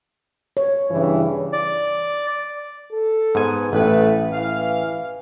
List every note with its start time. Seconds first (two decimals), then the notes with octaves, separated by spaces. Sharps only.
0.57 C#5
0.91 G2 C#3 E3
1.53 D5
2.92 A4
3.35 G#2 B3 G#5
3.73 A1 A3 B4
4.32 E3 F5